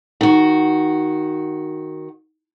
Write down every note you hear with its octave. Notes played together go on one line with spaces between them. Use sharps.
D#3 F#4